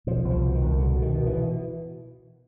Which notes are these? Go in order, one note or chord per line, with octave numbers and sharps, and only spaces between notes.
B2 F3
C2
F3
B2
D#3
C2
B2 D3
B2
D#3
B2
E3
B2